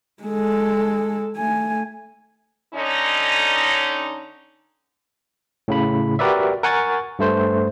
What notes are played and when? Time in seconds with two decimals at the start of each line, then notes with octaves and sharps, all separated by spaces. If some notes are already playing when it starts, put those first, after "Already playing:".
0.23 G#3 A4
1.36 A3 G#5
2.74 D3 C#4 D#4
5.68 A2 C#3 B5
6.19 F#4 G4 A#4 B4 D5 E5
6.63 A#4 F#5 G#5 C#6 A6
7.19 G2 A3 C5